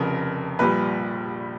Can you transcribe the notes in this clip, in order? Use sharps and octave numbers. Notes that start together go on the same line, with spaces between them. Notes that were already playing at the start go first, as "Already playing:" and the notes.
Already playing: F1 F2 C#3 A#4
A#1 A#2 G3 B4